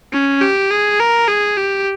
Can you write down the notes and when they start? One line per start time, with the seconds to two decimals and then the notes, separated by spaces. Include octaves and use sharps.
0.12 C#4
0.42 G4
0.71 G#4
1.00 A#4
1.28 G#4
1.57 G4